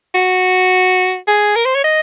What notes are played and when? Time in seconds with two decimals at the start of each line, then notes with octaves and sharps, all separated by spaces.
0.15 F#4
1.28 G#4
1.56 A#4
1.65 C5
1.75 C#5
1.84 D#5